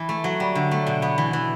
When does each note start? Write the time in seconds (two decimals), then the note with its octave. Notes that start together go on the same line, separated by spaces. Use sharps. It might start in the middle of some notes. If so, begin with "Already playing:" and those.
Already playing: E3
0.09 A3
0.24 F#3
0.40 G3
0.55 D3
0.71 A3
0.87 B2
1.02 B3
1.18 E3
1.33 E3